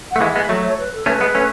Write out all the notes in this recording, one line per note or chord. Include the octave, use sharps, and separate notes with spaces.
F#5
A3
E3 G#3 E5
G#3 B3 E5
F#3 A3 E5
C#5
B4
A4
A3 C#4 B4
G#3 B3
A3 C#4